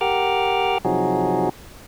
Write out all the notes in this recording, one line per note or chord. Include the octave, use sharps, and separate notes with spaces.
G4 A#4 F#5 D6 F6
C3 F3 F#3 D#4 F#4 G#4